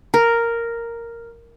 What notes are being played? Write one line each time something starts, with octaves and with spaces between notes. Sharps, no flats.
A#4